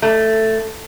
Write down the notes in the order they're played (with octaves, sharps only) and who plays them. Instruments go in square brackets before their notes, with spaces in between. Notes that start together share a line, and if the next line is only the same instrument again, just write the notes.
[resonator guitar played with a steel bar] A3